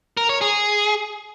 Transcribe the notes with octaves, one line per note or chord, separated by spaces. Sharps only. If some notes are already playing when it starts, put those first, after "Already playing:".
A#4
C#5
G#4